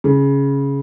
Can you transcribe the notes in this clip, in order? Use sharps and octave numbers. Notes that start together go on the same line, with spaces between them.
C#3